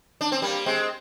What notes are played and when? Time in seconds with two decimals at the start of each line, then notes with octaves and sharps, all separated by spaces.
0.21 D4
0.32 C4
0.42 G3 A#3
0.66 G#3 C4